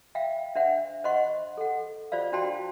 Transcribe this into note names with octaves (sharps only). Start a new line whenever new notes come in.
E5 F5 G5
D4 C5 E5 F#5
C5 D#5 F#5 C6 C#6
A4 F#5
F4 C5 D5 F5
D4 F#4 C5 G5 A5 C6